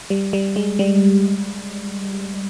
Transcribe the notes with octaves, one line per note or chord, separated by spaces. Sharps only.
G3
G3
G#3
G3